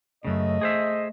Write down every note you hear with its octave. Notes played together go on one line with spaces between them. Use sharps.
F#2 C#3 A3 D#5
G#4 C5 E5